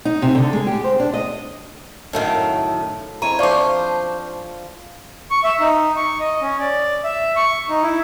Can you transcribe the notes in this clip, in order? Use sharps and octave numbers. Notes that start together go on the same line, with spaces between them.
D#4
C3
D3
G#3
G4
C5
D4
D#5
F#2 A2 D#3 A4 F5 G5
G#3 C4 E4 C#5 A#5 D#7
F3 D4 F4 C5 D5 F5 C#6 D6
C#6
E5
D#4
C#6
D#5
C#4
D5
E5
C#6
D#4
E4